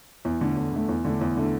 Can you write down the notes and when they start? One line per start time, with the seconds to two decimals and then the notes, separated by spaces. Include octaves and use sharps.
0.25 E2
0.41 D3 A3
0.57 E2
0.73 D3 A3
0.89 E2
1.05 D3 A3 D4
1.21 E2
1.37 D3 A3 D4